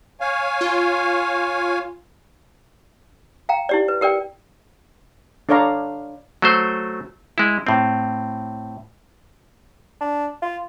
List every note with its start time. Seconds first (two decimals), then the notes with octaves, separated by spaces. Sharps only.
0.21 C#5 F5 G#5
0.61 F4
3.49 F5 G5 A#5
3.69 E4 G4 D5
3.88 B4
4.01 G4 A#4 D5 G5
5.49 D4 A4 C#5 D5 F5 A#5
6.42 F#3 A3 C5
7.38 G#3 E4
7.67 A2 C4
10.01 D4
10.42 F4